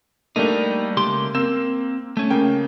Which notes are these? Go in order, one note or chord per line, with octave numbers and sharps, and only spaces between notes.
G3 A3 A#3 D4 D#4
C#2 G4 C6
A#3 C4 E6 E7
A3 C#4
C#3 A#3 G5